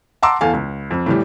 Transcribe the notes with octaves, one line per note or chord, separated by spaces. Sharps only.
F#5 A5 A#5 C6 D6 E6
E2 A4 F5 G#5
C#2
F2
A2 E3 G3